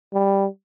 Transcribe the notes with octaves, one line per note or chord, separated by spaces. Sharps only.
G3